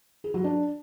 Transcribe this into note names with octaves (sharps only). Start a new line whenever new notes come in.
G#4
F#3
D4